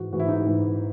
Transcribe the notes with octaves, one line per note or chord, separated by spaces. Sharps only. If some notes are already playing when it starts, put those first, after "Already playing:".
Already playing: G#2 E3 F#4
G#2 E3 F#4
E4
D#4
E4
G#2 E3